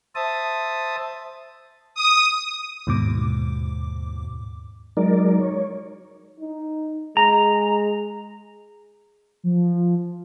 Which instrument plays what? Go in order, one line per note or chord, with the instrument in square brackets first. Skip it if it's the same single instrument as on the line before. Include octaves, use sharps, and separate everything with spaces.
[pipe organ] C5 E5 A5 D#6
[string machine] D#6
[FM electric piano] D#2 G#2 B2 D6
[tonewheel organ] F#3 G#3 D#4 A#4 D5
C#5
[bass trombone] D#4
[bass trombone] G#3 [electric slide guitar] A#5
[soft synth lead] F3